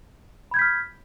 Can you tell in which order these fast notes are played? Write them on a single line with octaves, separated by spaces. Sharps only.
B5 G#6 G6 B6 F6